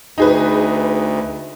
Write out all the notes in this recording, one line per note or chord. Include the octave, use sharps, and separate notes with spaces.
D2 D#4 G#4 B4